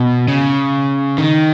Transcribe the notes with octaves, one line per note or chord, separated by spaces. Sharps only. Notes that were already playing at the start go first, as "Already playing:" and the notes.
Already playing: B2
C#3
D#3